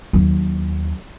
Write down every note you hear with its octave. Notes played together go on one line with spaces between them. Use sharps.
D#2 F#3